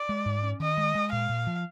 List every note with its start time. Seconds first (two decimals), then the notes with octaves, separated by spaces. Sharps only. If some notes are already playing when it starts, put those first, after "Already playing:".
Already playing: D5
0.09 G#3
0.26 G#2
0.43 C#4
0.60 D#3 D#5
0.78 G#3
0.95 G#3
1.12 A#2 F5
1.29 A#2
1.47 F3